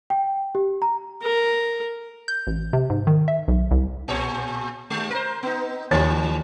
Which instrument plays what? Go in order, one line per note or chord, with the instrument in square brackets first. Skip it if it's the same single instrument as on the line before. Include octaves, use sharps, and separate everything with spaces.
[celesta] G5
G4
A#5
[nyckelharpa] A#4
[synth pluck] G6
A1
C3
G#2
D#3
E5
B1
C2
[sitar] A#2 G#4 C#5
D#2 G#3
A#4 C5
B3 D#4
[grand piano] D#2 C#5 A6 [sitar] E3 G3